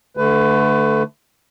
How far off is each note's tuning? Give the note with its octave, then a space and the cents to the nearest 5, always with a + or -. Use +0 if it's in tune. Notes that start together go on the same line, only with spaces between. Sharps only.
D3 +0 A3 +0 B4 +30